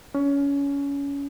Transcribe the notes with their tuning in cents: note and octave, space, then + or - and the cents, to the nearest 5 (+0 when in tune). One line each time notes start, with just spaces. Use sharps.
C#4 +25